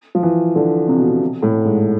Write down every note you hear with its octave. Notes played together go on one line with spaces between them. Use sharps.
F3
E3
D3
C3
B2
C3
C3
A2
G#2